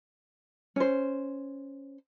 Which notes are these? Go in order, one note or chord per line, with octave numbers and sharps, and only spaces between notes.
C#4 C5